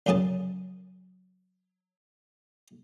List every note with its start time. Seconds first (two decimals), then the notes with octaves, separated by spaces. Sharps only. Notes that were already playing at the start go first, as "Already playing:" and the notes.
0.06 C#2 F#2 C#3 G#4 A5